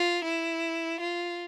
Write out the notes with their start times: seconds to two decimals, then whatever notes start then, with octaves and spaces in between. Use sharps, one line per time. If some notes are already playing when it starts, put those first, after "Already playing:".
Already playing: F4
0.24 E4
1.00 F4